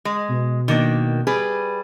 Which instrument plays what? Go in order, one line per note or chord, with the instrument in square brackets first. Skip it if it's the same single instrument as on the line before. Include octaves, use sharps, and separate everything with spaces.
[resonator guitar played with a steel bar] G#3
[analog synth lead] B2
[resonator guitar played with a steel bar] D#3 A#3 D4
G3 G#4 B4